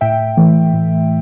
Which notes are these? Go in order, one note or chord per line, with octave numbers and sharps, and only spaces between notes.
A2 E5 G5
E3 A3
A2